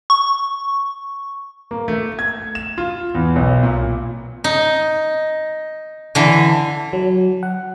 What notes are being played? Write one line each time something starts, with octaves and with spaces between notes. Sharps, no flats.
C#6
A#3
A3
G#6
E7
F4
E2
B1
A#2
D#4
D3 E3
F#3
F#5